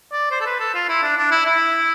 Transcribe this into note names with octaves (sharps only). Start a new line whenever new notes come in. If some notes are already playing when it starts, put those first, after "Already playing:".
D5
C5
A4
B4
A4
F4
E4
D4
D4
E4
E4